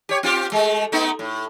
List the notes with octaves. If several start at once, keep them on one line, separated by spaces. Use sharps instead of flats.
G4 C#5
C4 F4 G4
G#3 A3
A3 B3 D#4
A2